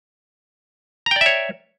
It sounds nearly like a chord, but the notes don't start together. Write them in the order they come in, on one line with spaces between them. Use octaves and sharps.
A#5 G5 D5 E5 C#5